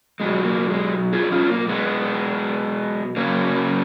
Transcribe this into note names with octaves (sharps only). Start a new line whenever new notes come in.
B2 F#3 G#3
A#3
G#3
F4 G#4
C#4 F4
A#3
G#3 B3
C#3 F#3 A#3 C#4